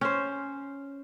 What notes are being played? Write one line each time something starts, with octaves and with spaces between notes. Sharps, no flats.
C#4 C5